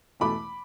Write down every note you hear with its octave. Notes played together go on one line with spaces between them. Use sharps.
E2 B2 A3 B5 D6